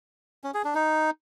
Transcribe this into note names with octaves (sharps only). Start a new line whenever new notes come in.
C#4
G#4
D4
D#4